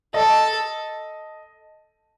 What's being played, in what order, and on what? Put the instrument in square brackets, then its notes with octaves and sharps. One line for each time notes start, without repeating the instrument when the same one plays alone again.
[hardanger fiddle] A4 [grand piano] D#5